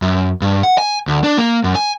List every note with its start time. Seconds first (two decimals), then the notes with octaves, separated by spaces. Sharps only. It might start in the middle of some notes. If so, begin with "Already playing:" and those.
0.02 F#2
0.42 G2
0.63 F#5
0.78 G#5
1.08 D2
1.24 D4
1.37 A#3
1.64 F#2
1.75 G#5